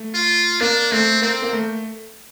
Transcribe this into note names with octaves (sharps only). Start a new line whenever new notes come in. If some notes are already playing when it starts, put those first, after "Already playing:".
Already playing: A3
F4
A#3 D4
A3 C4
A#3 C4
A#3
A3